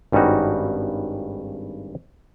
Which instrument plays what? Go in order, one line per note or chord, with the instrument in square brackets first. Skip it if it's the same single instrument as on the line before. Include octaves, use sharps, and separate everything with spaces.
[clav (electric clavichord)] G#1 G2 G3 C#4 D#4 F#4